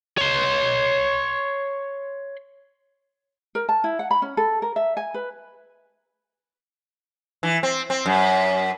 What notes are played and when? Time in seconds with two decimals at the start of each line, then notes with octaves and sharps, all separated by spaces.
0.18 C#5 C6
3.55 A#4
3.69 A5
3.84 E4
3.99 F#5
4.11 B5
4.22 C#4
4.37 A4
4.62 A#4
4.76 E5
4.97 G#5
5.14 B4
7.43 E3
7.63 C4
7.90 C4
8.06 F#2